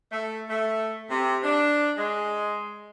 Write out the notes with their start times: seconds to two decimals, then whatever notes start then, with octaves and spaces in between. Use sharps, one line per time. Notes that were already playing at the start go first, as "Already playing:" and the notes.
0.10 A3
0.50 A3
1.09 C3
1.43 D4
1.97 G#3